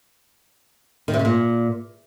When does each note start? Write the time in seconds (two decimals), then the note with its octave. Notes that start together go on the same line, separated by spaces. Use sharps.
1.08 D#3
1.14 C3
1.19 C#3
1.25 A#2